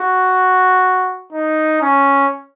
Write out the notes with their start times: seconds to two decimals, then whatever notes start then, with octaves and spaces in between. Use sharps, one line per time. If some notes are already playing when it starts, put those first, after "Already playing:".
Already playing: F#4
1.33 D#4
1.81 C#4